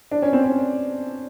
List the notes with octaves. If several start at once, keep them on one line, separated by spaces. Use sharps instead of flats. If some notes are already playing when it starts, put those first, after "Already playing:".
D4
C#4
C4
C#4